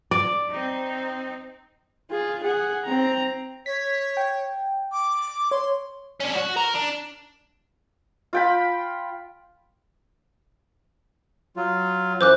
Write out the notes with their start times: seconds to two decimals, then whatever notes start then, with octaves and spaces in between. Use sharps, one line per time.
0.11 D5
0.50 C4 D#4
2.10 F4 G#4
2.44 G#4 F#5
2.85 C4 A#5
3.66 C#5 B6
4.17 G5
4.92 D6
5.51 C#5 C6
6.20 C#4 D4
6.35 F#4
6.57 A#4
6.75 D4
8.33 F4 G5 B5
11.57 F#3 F4
12.21 F#2 E3 C5 D6 F#6